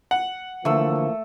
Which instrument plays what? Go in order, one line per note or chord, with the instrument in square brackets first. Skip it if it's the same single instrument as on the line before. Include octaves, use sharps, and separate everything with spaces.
[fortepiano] F#5
[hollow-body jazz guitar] D3 [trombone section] E3 F3 A#3 [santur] A3 E6